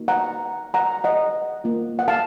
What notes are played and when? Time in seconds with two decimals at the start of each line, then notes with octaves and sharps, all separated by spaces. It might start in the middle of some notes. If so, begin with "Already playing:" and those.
Already playing: A#3 D#4 F#4
0.08 F#5 A#5
0.74 F#5 A#5
1.04 D#5 F#5
1.64 A#3 F4
1.99 F#5
2.08 F5 A5